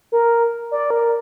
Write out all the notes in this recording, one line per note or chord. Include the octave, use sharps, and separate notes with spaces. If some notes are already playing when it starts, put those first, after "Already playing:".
A#4
D5
A#4